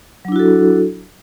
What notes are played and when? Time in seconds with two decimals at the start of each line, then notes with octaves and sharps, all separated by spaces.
0.25 F#3
0.28 D4
0.32 E4
0.36 F#4
0.39 A4